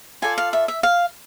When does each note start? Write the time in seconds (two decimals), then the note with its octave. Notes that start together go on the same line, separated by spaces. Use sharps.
0.22 F4 A4 D5 G#5
0.38 F5
0.53 E5
0.68 E5
0.83 F5